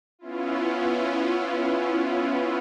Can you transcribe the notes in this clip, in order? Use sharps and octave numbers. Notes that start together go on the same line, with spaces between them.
B3 C#4 E4 F4